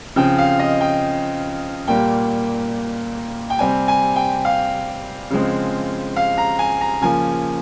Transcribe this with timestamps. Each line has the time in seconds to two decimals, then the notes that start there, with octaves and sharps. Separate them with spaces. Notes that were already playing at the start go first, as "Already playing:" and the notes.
0.16 C#3 F3 C4 G5
0.38 F5
0.59 D#5
0.81 G5
1.88 A#2 G3 A#3 G5
3.50 G5
3.59 C3 G3 C4 G#5
3.88 G#5
4.16 G5
4.45 F5
5.30 C#3 F3 G#3 C4
6.16 F5
6.38 A#5
6.59 G#5
6.81 A#5
7.01 C#3 F3 A#3 G#5